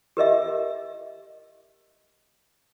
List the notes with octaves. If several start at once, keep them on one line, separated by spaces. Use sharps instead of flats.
G4 A#4 D#5 E5